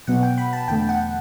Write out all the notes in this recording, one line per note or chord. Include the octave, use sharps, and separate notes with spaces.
B2 F#3 B3 F#5
G5
B5
A5
E2 D3 A3 G5
F#5